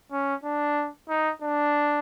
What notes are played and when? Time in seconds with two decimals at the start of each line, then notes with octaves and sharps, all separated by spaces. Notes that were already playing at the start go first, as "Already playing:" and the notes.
0.12 C#4
0.44 D4
1.09 D#4
1.42 D4